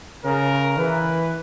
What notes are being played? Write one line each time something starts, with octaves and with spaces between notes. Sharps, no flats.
C#3 A#4
E3 B4